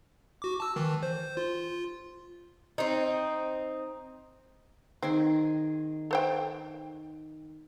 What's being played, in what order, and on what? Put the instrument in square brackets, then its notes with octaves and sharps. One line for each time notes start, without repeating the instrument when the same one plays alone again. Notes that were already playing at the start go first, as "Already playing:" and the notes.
[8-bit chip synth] F#4 D6
A5 E6
D#3 E3
C5
F4
[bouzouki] C4 D#4
[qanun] D#3 G#4 G#5 [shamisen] C4
[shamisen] A4 C5 G5